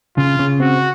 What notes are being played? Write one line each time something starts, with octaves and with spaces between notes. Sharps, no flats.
C#3 F4
C#3
C4 F#4